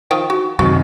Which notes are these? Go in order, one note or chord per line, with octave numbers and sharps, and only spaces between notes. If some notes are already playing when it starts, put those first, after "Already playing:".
D#3 F3 G5
F#4
F#2 C3 D#3 F#4